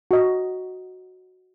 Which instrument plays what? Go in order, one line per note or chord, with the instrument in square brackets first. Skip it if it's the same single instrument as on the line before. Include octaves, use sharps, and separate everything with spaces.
[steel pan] F#4 D#5